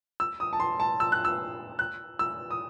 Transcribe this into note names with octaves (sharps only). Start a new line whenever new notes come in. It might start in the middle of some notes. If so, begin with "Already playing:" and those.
E6
D#6
A5
C6
A5
E6
F#6
E6
F#6
E6
D#6